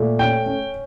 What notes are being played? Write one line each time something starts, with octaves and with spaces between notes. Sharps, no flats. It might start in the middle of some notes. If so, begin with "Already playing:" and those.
Already playing: A#2 A3
C#4 G5
C#4